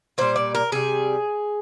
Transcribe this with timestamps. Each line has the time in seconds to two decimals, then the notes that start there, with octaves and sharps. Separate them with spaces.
0.18 A#2 G3 C5
0.36 D5
0.55 A#4
0.72 C3 G3 G#4